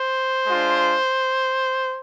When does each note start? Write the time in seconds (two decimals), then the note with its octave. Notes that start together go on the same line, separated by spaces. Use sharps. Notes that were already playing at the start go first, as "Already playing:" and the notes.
Already playing: C5
0.46 G#3 D4 F4